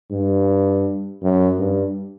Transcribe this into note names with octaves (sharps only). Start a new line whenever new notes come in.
G2
F#2
G2